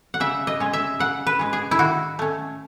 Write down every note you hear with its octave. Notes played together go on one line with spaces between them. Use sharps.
F#5
C#3 E5
D#5
G#3 C#4
E5
C#3 F#5
B4
G#3 C#4
G#4
E4
D#3 F#4
A3 C#4